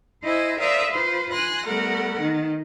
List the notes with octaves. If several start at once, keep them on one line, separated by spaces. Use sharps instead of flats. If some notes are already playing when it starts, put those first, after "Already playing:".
E4 C5 D#5 E5 G#5
A#4 C5 D5 E5 F5 D#6
F4 B4 C5
G#5 C6 F#6 A#6
G3 A3 B3 A#4 F#5
D#3